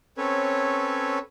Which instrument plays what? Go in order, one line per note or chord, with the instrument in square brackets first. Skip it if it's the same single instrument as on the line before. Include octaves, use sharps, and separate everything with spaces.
[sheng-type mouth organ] C4 C#4 A4 B4 C#5